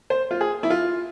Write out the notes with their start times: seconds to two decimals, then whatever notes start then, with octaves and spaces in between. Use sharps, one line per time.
0.10 C5
0.31 F4
0.41 G#4
0.63 E4
0.70 F4